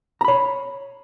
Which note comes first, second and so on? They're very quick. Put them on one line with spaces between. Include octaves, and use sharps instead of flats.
A#5 B5 C#5